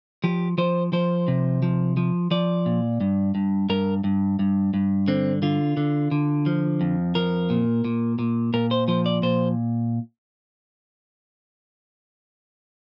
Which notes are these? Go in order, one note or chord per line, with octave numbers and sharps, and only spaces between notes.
F3 G4
F3 C5
F3 C5
C3
F3
F3
F3 D5
A#2
G2
G2
G2 A#4
G2
G2
G2
D3 C4
D3 F4
D3
D3
F3
F2
F3 A#4
A#2
A#2
A#2
A#2 A#4
C5
F3 C5
D5
A#2 C5